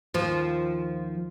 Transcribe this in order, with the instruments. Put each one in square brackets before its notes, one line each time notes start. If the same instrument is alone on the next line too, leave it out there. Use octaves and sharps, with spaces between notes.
[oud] D#2 F3